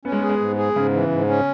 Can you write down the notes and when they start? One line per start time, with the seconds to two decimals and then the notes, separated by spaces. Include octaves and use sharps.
0.05 B3 C#4
0.12 G#3
0.19 B3
0.22 G#4
0.29 G#3
0.40 G#2
0.57 G#4
0.75 G#2 C#3
0.93 E3
1.11 G#2
1.28 C#4